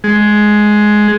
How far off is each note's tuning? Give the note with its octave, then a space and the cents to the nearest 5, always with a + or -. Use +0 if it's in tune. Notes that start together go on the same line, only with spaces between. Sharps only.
G#3 +10